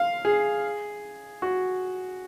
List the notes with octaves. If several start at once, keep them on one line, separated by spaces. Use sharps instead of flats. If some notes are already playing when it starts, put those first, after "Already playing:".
Already playing: F5
G#4
F#4